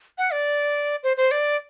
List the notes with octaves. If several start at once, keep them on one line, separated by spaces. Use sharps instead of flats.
F#5
D5
C5
C5
D5